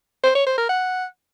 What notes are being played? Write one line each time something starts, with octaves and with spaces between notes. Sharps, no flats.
C5
C#5
C5
A#4
F#5